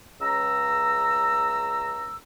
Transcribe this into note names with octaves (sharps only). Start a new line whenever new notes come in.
C#2 A#5 E6